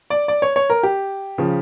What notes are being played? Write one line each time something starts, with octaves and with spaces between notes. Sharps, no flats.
D5
D5
C#5
C#5
A#4
G4
C#3 F3